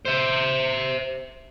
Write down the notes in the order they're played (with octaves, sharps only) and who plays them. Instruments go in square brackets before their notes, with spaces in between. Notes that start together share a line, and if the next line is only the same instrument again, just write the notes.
[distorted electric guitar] C5 E5